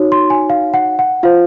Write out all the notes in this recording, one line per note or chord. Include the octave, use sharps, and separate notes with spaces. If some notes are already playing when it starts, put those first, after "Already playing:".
Already playing: D#4 F#4 C#5
C6
G#5
F5
F#5
F#5
F4 C5 F5